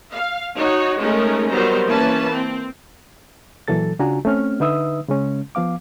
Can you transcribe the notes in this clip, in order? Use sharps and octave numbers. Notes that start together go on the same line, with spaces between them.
F5
D#4 F#4 C#5
G#3 A3 C#4 D#4 A#4
D#3 F#3 G3 B3 C5 A#5
E3 A#3 C#4 B4 A5
C4
A#2 E3 F#3 A4 A6
C#3 D4 F4 F#4 G#5 A#5
A3 C4 C#4 F6
D3 D#4 B4 E5 D#6 E6
C#3 G#3 C#4
F3 B3 F5 D6